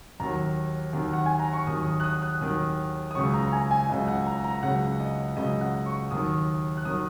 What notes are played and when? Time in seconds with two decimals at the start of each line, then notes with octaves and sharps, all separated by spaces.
0.20 D#2 D#3 F#3 A#5
0.93 D#2 D#3 F#3
1.13 F#5
1.26 G#5
1.39 A#5
1.53 C#6
1.67 D#2 D#3 F#3 D#6
1.86 D#6
2.00 F#6
2.04 D#6
2.22 F#6
2.41 D#2 D#3 F#3 D#6
3.11 D#6
3.14 C#2 C#3 F#3 C#6
3.34 A#5
3.48 A#5
3.52 G#5
3.71 G#5
3.89 C#2 C#3 F#3 D#5
4.08 F#5
4.27 A#5
4.44 A#5
4.63 C#2 C#3 F#3 F#5
5.00 D#5
5.37 C#2 C#3 F#3 D#5
5.61 F#5
5.86 C#6
6.11 D#2 D#3 F#3 D#6
6.77 F#6
6.85 D#3 F#3 D#6